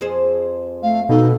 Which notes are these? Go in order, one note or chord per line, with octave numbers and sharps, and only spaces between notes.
F2 G#4 C5
A3 F5
B2 D#4 A4